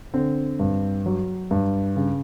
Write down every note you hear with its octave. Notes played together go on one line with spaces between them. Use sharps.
D3 C4
G2
F#3
G2
C#3